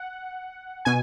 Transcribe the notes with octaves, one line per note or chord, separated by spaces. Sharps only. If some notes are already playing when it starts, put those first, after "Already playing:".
Already playing: F#5
B2 G#5